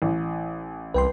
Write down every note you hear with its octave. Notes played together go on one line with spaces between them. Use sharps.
A1
C2 B4 G5 C6